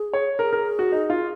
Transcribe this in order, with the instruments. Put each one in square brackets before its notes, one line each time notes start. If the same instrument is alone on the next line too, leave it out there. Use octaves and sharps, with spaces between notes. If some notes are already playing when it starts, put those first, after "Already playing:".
Already playing: [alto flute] G#4
[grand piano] C#5
[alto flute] G#4 [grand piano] A#4
[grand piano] A#4
F#4
D#4
F4